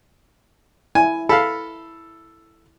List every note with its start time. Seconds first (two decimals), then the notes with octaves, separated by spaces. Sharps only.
0.95 E4 G#5
1.29 A4 F5 B5